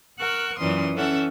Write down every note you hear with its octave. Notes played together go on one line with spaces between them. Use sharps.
A#4 F#5 C#6 E6 F#6
F#2 A#2 E3 C#4 C6 D#6
E3 C#4 A4 E5 F#5